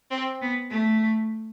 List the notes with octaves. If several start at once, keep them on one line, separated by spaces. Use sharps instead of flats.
C4
B3
A3